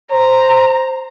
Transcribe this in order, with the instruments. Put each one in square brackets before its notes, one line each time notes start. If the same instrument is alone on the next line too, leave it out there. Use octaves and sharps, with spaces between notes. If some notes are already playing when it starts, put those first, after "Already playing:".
[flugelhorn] C5 [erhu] A#5